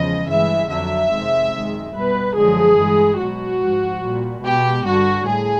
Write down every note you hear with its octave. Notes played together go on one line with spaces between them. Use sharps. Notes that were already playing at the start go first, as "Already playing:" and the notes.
Already playing: E2 C#3 F3 G#3 D#5
G2 E3 G#3 E5
F2 D3 F#3 E5
F2 C3 D#3 G#3
F#2 D#3 G#3
B2 G3 B4
F#2 D3 F3 G#3 G#4
G2 E3 G#3
B2 F#3 F#4
G#2 F3 G#3
A#2 G3
B2 G#3 G4
G2 D3 G3 F#4
A2 G#4